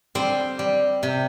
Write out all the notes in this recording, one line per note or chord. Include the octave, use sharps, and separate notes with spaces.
G3 C4 C5
G3
C3